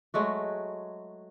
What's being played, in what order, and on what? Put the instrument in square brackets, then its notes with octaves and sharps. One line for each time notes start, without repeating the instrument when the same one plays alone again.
[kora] F#3 G#3 A3 F#4